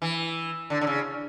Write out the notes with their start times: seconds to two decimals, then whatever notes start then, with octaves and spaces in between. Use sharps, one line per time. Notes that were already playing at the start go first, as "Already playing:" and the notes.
0.02 E3
0.70 D3
0.81 D3
0.87 C#3